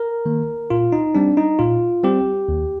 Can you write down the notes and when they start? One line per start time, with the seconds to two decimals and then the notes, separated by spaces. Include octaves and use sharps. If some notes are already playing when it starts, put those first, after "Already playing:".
Already playing: A#4
0.26 D#3 A#3
0.70 A#2 F4
0.92 D#4
1.15 G3 C4 D4
1.37 D#4
1.59 A#2 F4
2.04 G3 C4 G4
2.48 D#2